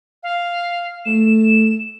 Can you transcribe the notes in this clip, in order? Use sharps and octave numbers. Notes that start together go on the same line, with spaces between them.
F5
A3 E7